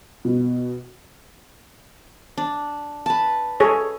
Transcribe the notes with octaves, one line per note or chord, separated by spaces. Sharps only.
B2
D4
B4 A5
G#4 A4 C#5